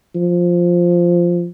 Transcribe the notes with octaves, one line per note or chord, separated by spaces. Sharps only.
F3